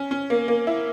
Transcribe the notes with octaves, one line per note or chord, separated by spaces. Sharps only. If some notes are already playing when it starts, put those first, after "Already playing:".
Already playing: C#4
C#4
A#3
A#3
E4